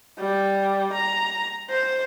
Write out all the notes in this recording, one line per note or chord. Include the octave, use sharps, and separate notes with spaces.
G3
A#5
C5